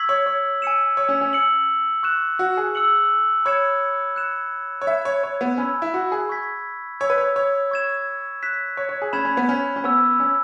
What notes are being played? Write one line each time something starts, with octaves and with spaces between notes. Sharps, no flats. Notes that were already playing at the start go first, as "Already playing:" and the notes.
Already playing: C#6 E6 G#6 B6 F#7
C#5
C#5
G#5 E6 C#7 E7
C#5
C#4
C#4
E6 C#7 F#7
C#6 F#6 E7
F#4
G#4
E6 C#7 F#7
C#5 B5 G#6 C#7 E7
F#6 C#7 E7
C#5
E5 G#5 B5 G#6 E7
C#5
C#5
B3
C#4 G#5 B5 E6 G#6
E4
F#4
G#4
C#6 G#6 B6
C#5 G#5 E6 G#6
B4
C#5
C#5
C#6 G#6 E7
F#6 B6 E7
C#5
C#5
G#4
C#4 B5 G#6 E7
C#4
B3
C#4
C#4
B3 G#5 C#6 E6
C#4